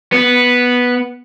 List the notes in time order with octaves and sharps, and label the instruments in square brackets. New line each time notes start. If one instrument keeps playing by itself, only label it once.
[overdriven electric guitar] B3